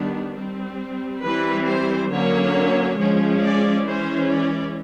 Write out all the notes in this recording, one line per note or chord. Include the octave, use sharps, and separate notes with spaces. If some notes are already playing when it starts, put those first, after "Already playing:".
Already playing: D#3 G3 B3 D4
G3 C4
E3 G3 C4 B4
C5
D3 F#3 A#3 C#4 C#5
F3 G#3 C#4
D5
E3 G#3 C#4 C5
D5